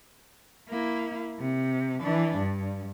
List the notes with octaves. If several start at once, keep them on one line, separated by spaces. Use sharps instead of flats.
A#3 E4
C3
E3 D4
G2